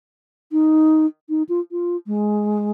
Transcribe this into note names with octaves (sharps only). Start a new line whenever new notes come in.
D#4
D#4
F4
F4
G#3